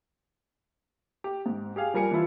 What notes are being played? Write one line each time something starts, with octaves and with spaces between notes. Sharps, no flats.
G4
G#2
G4 G#4 F5 G#5
F3 G3 A#4 G#5 C#7
E3 F3 E4 F4